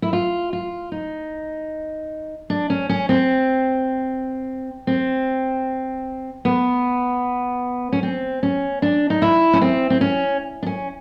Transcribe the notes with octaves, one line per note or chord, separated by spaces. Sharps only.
E4
F4
F4
D#4
D4
C#4
C#4
C4
C4
B3
C#4
C4
C#4
D4
D#4
E4
C#4
C4
C4
C#4
D4
C#4